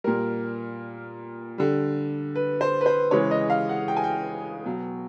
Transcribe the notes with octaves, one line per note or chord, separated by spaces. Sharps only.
A#2 G3 A#4
D3 G3
B4
C5
B4
C5
C#3 E3 G#3 C#5
D#5
F5
F#5
G5
G#5
G5
B2 F#3